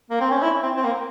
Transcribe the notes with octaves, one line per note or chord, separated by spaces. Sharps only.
A#3
C4
C#4
E4
C4
C4
A#3